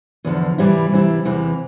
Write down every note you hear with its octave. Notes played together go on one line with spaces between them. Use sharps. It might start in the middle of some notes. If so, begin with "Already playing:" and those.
E2 D3 F3
C3 E3 G3 C4 E4
C3 E3 G3 C4 E4
E2 C3 E3